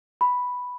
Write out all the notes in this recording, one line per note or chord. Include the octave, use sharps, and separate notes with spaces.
B5